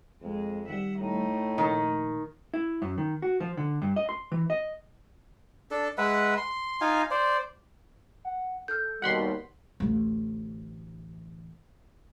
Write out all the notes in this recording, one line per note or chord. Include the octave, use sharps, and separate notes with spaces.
F2 G#3
D#3 G3 E5 F#5
A2 A3 D#4
A#2 D#3 F3
E4
F#2
D#3
F#4
F3
D3
G2
D#5
C6
E3
D#5
D4 A4
G#3 B4 E5 F#5
C6
D#4 F4 F5 G#5
C5 D5
F#5
A4 F6 G6
D#2 B2 G3 F#5 B5 C6
A1 D2